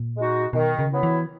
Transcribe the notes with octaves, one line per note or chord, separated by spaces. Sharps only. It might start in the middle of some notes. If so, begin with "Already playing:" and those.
Already playing: A#2
G#3 D#4 F#4
B2 D#3
C#3
F#3 B3 E4
E3